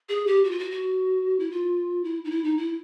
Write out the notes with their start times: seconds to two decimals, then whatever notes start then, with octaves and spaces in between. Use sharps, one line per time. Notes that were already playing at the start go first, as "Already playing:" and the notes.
0.09 G#4
0.27 G4
0.44 F#4
0.51 F4
0.59 F#4
0.71 F#4
1.39 E4
1.51 F4
2.04 E4
2.25 D#4
2.31 E4
2.44 D#4
2.57 E4